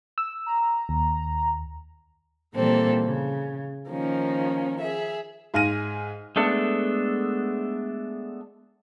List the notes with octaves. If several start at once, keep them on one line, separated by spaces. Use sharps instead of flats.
E6
A#5
D#2
A#2 E3 G3 A#3 C4 A4
C#3
D#3 F3 A#3 C#4
G#4 E5
G#2 F5 G#5 F6 A#6 D#7
G#3 A3 B3 D4 A4